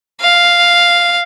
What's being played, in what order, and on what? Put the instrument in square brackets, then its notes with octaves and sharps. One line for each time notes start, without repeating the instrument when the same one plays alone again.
[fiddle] F5